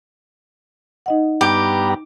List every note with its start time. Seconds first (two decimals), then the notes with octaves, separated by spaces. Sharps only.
1.06 D#4 D#5 F#5
1.41 G2 B3 G4 A#5